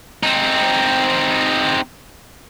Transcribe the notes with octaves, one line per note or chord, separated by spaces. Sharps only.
C4 D#4